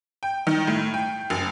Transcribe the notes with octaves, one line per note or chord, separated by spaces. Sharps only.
G5
D#3
A2
G5
F#1